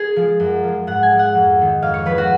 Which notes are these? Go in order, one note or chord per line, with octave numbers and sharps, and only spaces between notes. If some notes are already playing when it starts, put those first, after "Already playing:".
Already playing: G#4
F3 G#3
F#2
F3 G#3
G#2 F#5
G#5
F3 G#3
F#5
F2
D#3 G#3
F2 F5
C#5
F3 G#3 B4
F#4